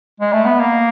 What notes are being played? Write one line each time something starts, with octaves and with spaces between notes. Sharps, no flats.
G#3
A3
B3
A#3